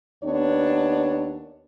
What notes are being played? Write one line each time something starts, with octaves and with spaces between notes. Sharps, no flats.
D#2 B3 D4 C#5